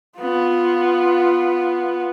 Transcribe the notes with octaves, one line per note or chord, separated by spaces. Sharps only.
B3 F4